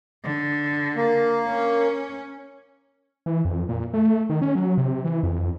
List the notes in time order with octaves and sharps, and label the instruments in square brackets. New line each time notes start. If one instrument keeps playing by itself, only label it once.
[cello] D3
[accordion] A#3
[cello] C#4
[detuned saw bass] E3
F2
A#2
A3
D#3
C#4
F#3
C3
E3
F2